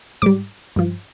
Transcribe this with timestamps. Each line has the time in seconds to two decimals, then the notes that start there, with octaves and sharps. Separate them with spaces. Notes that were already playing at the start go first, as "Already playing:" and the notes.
0.22 G#2 G3 D6
0.76 G2 F3